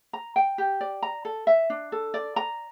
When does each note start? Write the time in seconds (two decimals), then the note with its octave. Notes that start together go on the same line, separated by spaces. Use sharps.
0.13 A#5
0.36 G5
0.58 G4
0.81 D5
1.02 A#5
1.25 A4
1.47 E5
1.70 D4
1.92 A4
2.14 D5
2.36 A#5